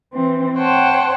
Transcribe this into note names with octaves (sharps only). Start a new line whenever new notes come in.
E3 C4
C5 C#5 F#5 G5 A5